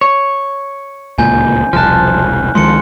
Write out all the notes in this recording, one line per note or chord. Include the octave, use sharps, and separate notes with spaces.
C#5
D1 C#2 A#2 G#5 G6
E1 C2 F3 A5 F6 F#6
C#2 D#3 F3 G#3 C6 C#7